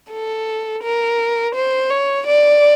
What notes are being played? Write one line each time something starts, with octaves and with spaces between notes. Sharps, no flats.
A4
A#4
C5
C#5
D5